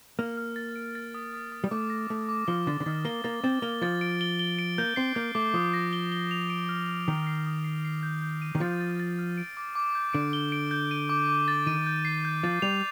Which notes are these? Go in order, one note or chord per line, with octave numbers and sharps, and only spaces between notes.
A#3 F6
F6
A6
D7
A6
D#6
D#6
D#6
G3
A3 D6
A#6
A3 D6
D6
F3 G7
D3 A6
D3
D#3 A6
A#3 G7
A#3 A6
C4 A6
A#3 G7
F3 A6
D7
G7
G7
D7
A#3 G6
C4 C7
A#3 G6
A3 D6
F3 D#6
A#6
G7
G7
F7
D7
F6
F6
D#3 D#6
C7
D#6
C7
C7
G6
G6
D#7
D#3
F3 A6
A6
A6
F6
D7
D6
D6
G6
D3 D7
G7
D7
G6
D#7
D6
D6
A6
D#3 D#7
G6
C7
G6
F3 A6
G3 F7